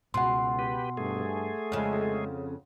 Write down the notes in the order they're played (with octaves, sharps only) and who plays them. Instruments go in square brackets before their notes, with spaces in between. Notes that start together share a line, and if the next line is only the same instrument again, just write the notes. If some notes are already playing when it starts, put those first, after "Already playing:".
[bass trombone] C#2 [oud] B2 [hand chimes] F#5 C6
[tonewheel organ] G4 B4
[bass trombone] G2 [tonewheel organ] A3 G#4
[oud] F2 C#3 [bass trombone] G#3